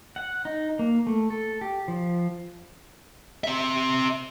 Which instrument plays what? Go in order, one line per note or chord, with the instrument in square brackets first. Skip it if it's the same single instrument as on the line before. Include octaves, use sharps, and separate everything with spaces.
[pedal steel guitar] F#5
D#4
A#3
A3
A4
G4
F3
[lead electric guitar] C4 E5